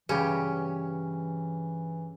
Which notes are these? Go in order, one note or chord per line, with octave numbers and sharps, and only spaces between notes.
G2 C#3 E3 C#4 G4